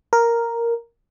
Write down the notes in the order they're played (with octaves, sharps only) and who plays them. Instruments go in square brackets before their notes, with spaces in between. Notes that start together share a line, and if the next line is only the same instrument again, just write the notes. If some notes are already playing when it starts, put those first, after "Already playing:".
[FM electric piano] A#4